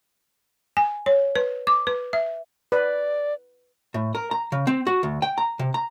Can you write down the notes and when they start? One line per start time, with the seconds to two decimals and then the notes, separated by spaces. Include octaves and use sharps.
0.77 G#5
1.06 C#5
1.36 B4
1.67 D6
1.87 B4
2.13 E5
2.72 B4 D5
3.94 A2
4.15 A#4
4.31 A#5
4.52 C#3
4.67 C4
4.87 F#4
5.03 D2
5.22 G5
5.38 A#5
5.59 C3
5.74 A#5